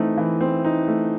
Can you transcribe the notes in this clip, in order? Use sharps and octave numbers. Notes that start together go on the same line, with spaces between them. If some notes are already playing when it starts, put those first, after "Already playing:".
Already playing: E3 A3 C4 D#4
E3
C4
D#4
A3